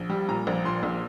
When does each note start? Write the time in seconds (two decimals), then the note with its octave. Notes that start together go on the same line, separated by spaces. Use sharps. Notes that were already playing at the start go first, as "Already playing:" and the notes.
Already playing: A#1
0.10 G3
0.29 A#2 A#5
0.47 A#1
0.65 A#2 C6
0.83 A#1